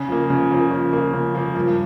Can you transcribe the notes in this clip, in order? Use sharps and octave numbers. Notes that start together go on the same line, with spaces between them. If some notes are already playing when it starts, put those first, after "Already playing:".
Already playing: C#3
F3 A#3
C#3
F3 A#3
C#3
F3 A#3
C#3
F3 A#3
G2